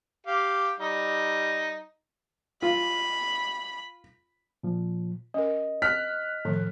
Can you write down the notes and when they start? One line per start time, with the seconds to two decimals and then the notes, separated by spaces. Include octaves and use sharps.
0.27 G4 F5
0.80 G3 D#4
2.62 F4 B5
4.63 A#2 F3
5.34 C#4 A#4 D#5
5.82 F6 F#6 B6
6.45 A2 D#3 F3 A3